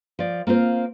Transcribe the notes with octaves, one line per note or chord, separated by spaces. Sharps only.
F3 D5
A#3 C4 F4 C5